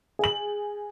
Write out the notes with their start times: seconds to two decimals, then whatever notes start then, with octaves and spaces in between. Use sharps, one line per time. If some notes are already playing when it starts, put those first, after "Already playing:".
0.19 G#4 F#7